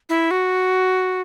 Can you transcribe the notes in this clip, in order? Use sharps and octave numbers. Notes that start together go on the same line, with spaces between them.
E4
F#4